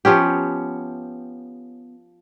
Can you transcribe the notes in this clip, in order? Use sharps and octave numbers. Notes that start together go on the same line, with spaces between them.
F3 B3 C#4 G4